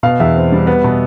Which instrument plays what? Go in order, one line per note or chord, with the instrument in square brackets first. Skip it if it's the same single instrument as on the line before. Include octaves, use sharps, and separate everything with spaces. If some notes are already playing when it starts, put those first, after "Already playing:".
[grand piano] B2 F5
E2 E5
C4
G3
B3
B2